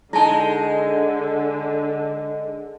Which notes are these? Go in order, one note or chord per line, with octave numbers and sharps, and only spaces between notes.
D3 G#3 D#4 E4 A5